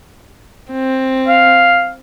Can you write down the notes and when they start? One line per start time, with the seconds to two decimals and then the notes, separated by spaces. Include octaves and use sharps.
0.72 C4
1.28 F5